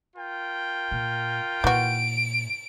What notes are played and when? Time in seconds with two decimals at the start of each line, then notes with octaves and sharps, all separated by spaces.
0.16 F4 A#4 G5
0.91 A#2
1.64 A#2 E3 F#4 D7